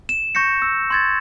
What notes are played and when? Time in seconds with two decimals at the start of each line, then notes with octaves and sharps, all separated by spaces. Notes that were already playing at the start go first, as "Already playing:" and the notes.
0.09 E7
0.35 C#6 G6 A#6 C#7
0.62 E6
0.90 C6 G#6 A6